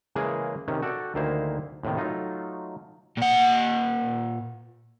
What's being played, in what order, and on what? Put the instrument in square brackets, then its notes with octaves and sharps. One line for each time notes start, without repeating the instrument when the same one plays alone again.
[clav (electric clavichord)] C#3 E3 G#3 A#3 G#4
C3 D#3 C#4
F#4 A4 D5 G5
D2 D#3 A#3 E4 C5
D#2 A2 C3 D#3
F#3 A3 D#4 F4
[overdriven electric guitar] A#2 F#5